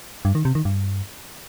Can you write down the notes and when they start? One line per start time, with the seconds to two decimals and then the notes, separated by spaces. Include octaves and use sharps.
0.25 G2
0.35 D#3
0.45 C3
0.55 D#3
0.65 G2